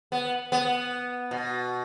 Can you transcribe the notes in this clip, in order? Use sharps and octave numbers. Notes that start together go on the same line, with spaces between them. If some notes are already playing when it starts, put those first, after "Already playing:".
B3
B3
B2